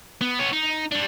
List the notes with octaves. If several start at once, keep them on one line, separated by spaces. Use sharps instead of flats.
B3
B3 C#5
D#4
G3 D4